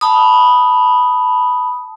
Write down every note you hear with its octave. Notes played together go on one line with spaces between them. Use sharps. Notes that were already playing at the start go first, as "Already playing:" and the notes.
A5 B5 D#6